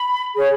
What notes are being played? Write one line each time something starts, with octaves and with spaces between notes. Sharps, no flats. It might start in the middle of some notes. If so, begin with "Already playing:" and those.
Already playing: B5
G#4 C#5